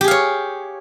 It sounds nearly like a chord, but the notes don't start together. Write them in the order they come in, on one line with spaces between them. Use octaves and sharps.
G4 G#4 F5 C#5